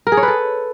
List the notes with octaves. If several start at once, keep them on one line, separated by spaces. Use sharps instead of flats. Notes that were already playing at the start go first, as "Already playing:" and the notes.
A#4
G#4
C#5
B4
A4